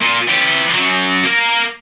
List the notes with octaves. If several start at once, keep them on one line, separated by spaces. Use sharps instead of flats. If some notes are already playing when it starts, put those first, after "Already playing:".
A#2
E3 G4
F#2 F#3
A#3 A#4